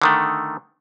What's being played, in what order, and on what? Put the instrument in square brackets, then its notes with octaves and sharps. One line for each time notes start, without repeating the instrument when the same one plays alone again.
[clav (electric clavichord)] D3 D#3 A3